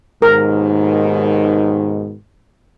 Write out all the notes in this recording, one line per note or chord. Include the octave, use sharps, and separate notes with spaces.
D#2 G#2 B2 D#3 A#4